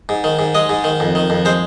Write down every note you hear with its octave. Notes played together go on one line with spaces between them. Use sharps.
G#2
D#3
G#2
G#3 D#5
G#2
D#3
F2
D#3
F2
G#3 C5